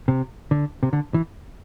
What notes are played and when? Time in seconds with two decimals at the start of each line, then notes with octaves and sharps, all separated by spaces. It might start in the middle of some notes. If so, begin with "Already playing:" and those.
0.08 C3
0.51 D3
0.83 C3
0.93 D3
1.14 E3